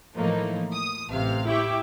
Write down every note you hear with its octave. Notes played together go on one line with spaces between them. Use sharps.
A2 E3 F3 A3 A#3 D#4
D#6
A1 C3 F5
E4 G4 E5 G5 C#6 D6